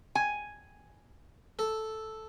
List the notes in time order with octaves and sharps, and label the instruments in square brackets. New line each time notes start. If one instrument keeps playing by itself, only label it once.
[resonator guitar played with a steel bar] G#5
[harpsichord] A4